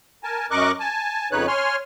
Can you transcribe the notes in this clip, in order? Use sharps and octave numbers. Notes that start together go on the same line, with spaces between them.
A#4 G#5 A5
F#2 A#4 D#5 C#6 D6 F#6
G#5 A5
F2 C#3 D#4 B4 C#5 F#6
C#5 G#5 C6 F6